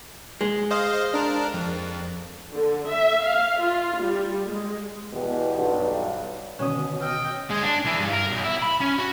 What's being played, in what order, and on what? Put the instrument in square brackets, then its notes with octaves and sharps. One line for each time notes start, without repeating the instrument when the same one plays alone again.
[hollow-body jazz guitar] G#3
[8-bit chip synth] C5 D#5 F5
D4 A#4
F2
[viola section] D3
E5
F5
F4
G3
G#3
[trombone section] E2 B2 B3 G4
B1 G2
[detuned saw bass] B2 [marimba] D3 D#3 [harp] C#4 D#6
[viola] D#5 G5 [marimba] E6 F6
[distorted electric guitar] G#3
D4
E3
G2
A#4
B1
E4
B5
C#4
F#4